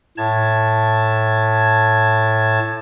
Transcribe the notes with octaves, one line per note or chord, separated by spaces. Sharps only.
A2 A5 G#6